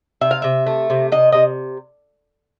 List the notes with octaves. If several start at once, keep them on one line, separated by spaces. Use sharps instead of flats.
C3 E5
F5
C3 E5
A3
C3
C3 D#5
C3 D#5